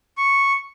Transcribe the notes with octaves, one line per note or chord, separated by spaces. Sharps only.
C#6